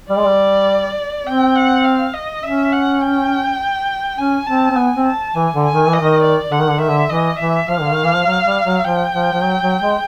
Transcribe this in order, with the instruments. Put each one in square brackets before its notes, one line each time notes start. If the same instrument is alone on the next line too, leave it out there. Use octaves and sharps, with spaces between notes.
[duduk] G3 [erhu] D5
[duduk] G#3
G3
[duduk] C4 [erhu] G5
[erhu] F#5
F5
D#5
[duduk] C#4 [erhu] E5
[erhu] F#5
G5
[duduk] C#4 [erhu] G#5
[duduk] C4 [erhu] A5
[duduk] C4
[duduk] B3 [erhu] G#5
[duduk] C4
[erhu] A5
[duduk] E3 [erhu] G#5
[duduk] D3
[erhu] G#5
[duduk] D#3
E3
[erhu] D#5
[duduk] D#3
[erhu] D5
[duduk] D3 [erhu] F#5
[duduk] D#3
D3
[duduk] D#3 [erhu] E5
[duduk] D3
[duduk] E3 [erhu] D#5
[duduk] E3 [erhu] E5
[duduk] F3 [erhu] F5
[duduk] D3
D#3
E3
F3
F#3
G3
F#3
[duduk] F3 [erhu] G5
[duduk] F3
F3
F#3
F#3
G#3